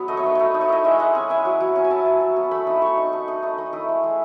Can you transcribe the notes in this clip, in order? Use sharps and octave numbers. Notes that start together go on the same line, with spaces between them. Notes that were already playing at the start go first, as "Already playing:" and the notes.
Already playing: F#3 B3
A3 D#5
C#5
D#4 B4
A3 C#5
D#4
C#5
E4 D#5
G#3 E5
G#3 F#5
C#4 G#5
E4 G#5
F#3
F#3
C#4
G#5
E4 A5
F#3
F#3
B3
A3 B5
D#4 D#6
A3 C#6
D#4
A3
D#4
A3 D#6
D#4 D#6
E4 D#6
G#3
G#3